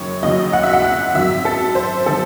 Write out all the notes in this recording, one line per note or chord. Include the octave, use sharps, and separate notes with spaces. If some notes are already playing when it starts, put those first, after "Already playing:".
Already playing: F#1 F#2 D#3 F#3 C#5
F#1 F#2 D#3 F#3 D#5
F#5
E5
F#5
F#5
G#1 F#2 D#3 F#3 E5
A4
C5
D#3 F#3 A4